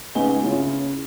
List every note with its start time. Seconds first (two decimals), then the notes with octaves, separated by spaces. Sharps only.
0.15 C#2 B3 D#4 G#5 G7
0.43 C#3 C#4 E4 F4